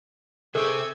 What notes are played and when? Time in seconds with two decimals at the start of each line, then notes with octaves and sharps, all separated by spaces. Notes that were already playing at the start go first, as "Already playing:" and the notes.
0.55 C3 G#4 A4 C5 E5 C#6 G#6